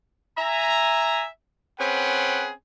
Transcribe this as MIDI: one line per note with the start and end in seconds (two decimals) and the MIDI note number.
0.38 1.25 76
0.38 1.25 80
0.38 1.25 82
1.79 2.52 60
1.79 2.52 61
1.79 2.52 68
1.79 2.52 71
1.79 2.52 78
1.79 2.52 79